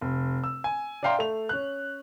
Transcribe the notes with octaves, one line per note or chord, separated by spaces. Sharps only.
F1
E6
G#5
D5 E5 F5 G5 A#5 C6
A3 F7
C#4 F#6